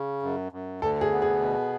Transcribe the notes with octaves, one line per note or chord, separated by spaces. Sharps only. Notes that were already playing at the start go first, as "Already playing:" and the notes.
Already playing: C#3
F#2
F#2
D2 A4
G#4
B3
G#4
B2